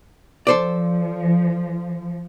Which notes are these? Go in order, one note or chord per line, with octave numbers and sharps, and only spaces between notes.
F3 A4 C5 D5